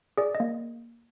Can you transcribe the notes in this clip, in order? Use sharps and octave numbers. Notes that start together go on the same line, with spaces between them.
G#4 D5
D#5
A#3